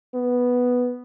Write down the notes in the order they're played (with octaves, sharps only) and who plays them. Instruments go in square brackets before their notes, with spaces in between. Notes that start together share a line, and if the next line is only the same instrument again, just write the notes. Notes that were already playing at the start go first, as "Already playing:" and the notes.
[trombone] B3